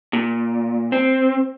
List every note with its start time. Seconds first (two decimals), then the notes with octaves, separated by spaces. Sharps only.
0.13 A#2
0.92 C4